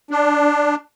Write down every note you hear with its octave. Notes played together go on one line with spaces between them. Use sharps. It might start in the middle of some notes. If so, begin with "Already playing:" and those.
D4